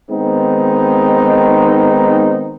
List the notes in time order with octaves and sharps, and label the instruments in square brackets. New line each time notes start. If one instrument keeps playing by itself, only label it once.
[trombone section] D#3 G#3 B3 C4 D#4